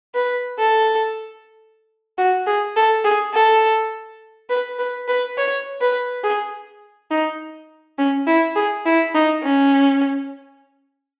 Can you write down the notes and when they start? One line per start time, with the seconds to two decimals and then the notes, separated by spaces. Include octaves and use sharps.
0.15 B4
0.59 A4
2.18 F#4
2.47 G#4
2.76 A4
3.05 G#4
3.34 A4
4.49 B4
4.79 B4
5.08 B4
5.38 C#5
5.81 B4
6.24 G#4
7.11 D#4
7.99 C#4
8.27 E4
8.56 G#4
8.86 E4
9.15 D#4
9.43 C#4